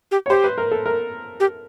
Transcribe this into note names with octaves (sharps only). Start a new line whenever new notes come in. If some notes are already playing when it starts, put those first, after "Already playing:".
G4
C#5
G4 C5
B4
A#4
A4
A#4
G4